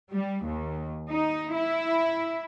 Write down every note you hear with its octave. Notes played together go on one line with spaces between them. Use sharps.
G3
D#2
D#4
E4